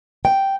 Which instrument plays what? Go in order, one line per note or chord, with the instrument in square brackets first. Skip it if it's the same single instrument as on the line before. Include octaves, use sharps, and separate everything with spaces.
[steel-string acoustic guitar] G5